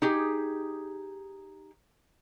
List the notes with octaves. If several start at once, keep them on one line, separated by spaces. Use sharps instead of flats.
D#4 G4 G#4